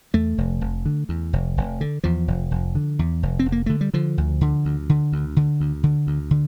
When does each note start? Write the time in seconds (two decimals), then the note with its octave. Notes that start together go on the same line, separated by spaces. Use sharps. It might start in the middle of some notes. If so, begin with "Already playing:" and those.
0.14 E2 A3
0.38 F1
0.61 F1
0.86 D3
1.09 E2
1.33 F1
1.57 F1
1.81 D3
2.04 E2 F3
2.28 F1
2.51 F1
2.75 D3
2.99 E2
3.23 F1
3.39 C4
3.46 F1
3.52 A#3
3.66 D3 A3
3.81 G3
3.94 D3 F3
4.18 D2
4.41 D3
4.65 D2
4.89 D3
5.12 D2
5.37 D3
5.60 D2
5.83 D3
6.07 D2
6.31 D3